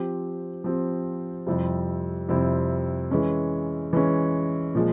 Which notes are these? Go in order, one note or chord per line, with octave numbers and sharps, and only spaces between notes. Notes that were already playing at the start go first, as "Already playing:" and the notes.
Already playing: F3 C4 G4
F3 C4 G4
F2 C3 G3 C4 E4
F2 C3 G3 C4 E4
E3 G#3 C#4
E3 G#3 C#4
A#2 F3 G#3